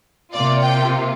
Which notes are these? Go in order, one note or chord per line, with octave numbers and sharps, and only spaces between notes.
C3 A#3 F4 D5
G5